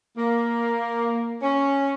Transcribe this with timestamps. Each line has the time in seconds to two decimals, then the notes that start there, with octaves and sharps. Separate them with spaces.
0.17 A#3
1.42 C#4